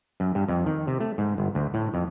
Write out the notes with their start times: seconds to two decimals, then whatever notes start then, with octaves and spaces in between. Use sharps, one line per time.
0.20 F#2
0.35 G2
0.48 F2
0.66 D#3
0.87 C3
1.00 A3
1.18 G#2
1.38 G1
1.55 D2
1.74 A2
1.94 F2